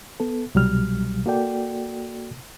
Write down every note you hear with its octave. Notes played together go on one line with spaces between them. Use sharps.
B3 A4
C2 B2 F#3 G3 F6
A#3 F#4 A4 D5 G5